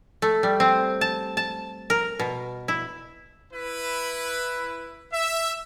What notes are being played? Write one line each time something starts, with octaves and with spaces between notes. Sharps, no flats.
A3
G3
C4
A5
A5
A#4
B2
E4
E4 B4
E5